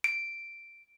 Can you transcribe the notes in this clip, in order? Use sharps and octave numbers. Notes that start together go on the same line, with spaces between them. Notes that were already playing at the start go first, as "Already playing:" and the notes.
D7